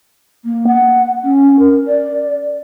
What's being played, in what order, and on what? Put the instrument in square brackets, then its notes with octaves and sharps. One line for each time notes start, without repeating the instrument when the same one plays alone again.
[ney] A#3
F#5
C#4
A#4
D5